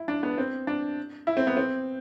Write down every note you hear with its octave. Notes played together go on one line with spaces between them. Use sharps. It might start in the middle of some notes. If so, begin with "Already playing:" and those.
Already playing: E4
D4
B3
C4
D4
E4
C4
B3
C4